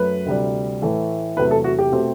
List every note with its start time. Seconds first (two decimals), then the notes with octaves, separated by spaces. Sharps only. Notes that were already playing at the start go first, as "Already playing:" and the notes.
Already playing: F#2 F#3 A3 B4
0.26 D2 C3 G3
0.82 A2 E3 A3
1.37 E2 C3 F#3 A3 B4
1.51 A4
1.64 F#4
1.79 G4
1.92 B2 A3 C4